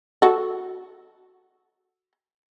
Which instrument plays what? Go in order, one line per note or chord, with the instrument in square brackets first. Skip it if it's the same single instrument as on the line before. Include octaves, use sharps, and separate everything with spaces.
[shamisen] F#4 A4